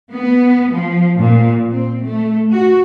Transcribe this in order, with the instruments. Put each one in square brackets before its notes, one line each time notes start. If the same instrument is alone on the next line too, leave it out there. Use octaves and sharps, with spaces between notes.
[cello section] B3
F3
A#2
C4
A3
F#4